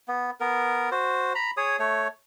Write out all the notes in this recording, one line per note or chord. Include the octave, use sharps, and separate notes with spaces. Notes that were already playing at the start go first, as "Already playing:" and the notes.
B3
B3 A#4
F#4 C5
A#5 B5
G#4 C#5 D#6
A3 C#5